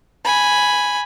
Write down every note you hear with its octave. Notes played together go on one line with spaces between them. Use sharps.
G#5 B5